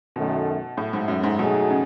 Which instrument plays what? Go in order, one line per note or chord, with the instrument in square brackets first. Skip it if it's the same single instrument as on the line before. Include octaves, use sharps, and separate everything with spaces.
[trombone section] F#2 D#3 A3 [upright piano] B2
[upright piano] A2
G#2
F#2
G#2
[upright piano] B2 [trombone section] F#3 A3 D#4 G#4
[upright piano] C#3